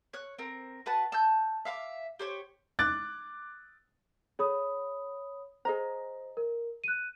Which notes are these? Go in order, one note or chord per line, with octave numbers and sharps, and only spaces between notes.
C#5 F#6
C4 A#4
F#4 B4 F#5 A5
A5 E6 G6
E5 F5 B5 D6
G4 C5 C#5
D6 F#6 A6
G#4 C#5 B5 D#6
G#4 C5 D#5 A#5
A#4
F#6 D#7